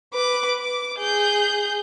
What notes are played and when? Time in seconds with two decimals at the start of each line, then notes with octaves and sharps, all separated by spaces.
0.13 B4 D6
0.60 D6
0.99 G#4 G6